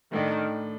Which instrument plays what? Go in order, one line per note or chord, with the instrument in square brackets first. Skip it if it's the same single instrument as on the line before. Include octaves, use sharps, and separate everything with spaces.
[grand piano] A2 A3 D4 [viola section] D#3